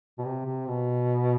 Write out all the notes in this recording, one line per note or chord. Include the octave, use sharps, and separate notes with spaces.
B2
C3
C3
B2